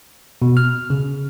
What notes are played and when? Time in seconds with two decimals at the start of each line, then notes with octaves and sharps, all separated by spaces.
0.42 B2
0.57 F6
0.90 C#3